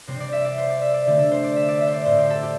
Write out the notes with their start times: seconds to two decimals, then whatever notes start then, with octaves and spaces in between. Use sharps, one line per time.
0.07 C3 G3 C4 C5
0.20 D5
0.32 E5
0.44 D5
0.58 C5
0.70 D5
0.82 E5
0.94 D5
1.06 D3 A3 C4 G4
1.19 A4
1.32 C5
1.44 D5
1.56 E5
1.68 D5
1.81 E5
1.87 C5
1.94 D5
2.05 A2 A3 C4 C5
2.19 G4
2.30 A4
2.43 G4